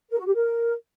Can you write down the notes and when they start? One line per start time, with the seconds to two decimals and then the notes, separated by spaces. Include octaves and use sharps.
0.11 A#4
0.19 F#4
0.27 G4
0.35 A#4